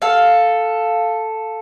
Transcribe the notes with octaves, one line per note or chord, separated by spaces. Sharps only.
A4 F5